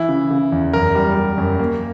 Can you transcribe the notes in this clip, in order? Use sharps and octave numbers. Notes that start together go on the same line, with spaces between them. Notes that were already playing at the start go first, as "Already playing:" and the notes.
Already playing: E3 E4
C#3
C#3
E2
F#2 A#4
G3
G3
F#2
A#3